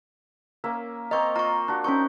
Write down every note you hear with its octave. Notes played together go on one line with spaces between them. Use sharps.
A#3 C#4 E5
A#3 C4 D#5 A#5 C#6
F4 A#5 C#6
D4 F#4
C4 C#4 D#4 D5 C#6